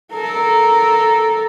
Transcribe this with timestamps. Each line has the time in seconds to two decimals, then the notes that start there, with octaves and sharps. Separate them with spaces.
0.13 A4 A#4